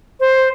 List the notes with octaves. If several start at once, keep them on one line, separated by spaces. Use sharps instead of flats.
C5